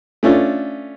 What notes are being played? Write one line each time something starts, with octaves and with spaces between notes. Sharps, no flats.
A3 C#4 D4 F4